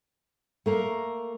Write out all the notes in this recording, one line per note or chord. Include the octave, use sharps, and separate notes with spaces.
A3 A#3 A#4